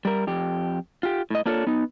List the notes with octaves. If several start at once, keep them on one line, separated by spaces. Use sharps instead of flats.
G3 A#4
F2 G4
F4 G4
A2 D#5
A#3 D4 F4 A4 B4 C#5
B3 D#4